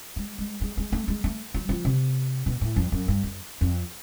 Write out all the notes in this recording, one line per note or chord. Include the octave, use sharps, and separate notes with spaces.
G#3
G#3
G#3
G#3
A3
G#3
A3
F#3
F3
C3
B2
A2
F2
F#2
G2
F#2
F2